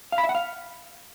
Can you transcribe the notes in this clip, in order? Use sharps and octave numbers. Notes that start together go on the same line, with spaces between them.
F5
B5
E5
F#5
F5